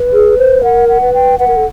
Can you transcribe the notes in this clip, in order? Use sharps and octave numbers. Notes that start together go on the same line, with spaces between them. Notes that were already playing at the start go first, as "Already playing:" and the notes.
Already playing: B4
G#4
C5
A#4 F#5
F#5
B4
G5
B4 F#5
A#4
A4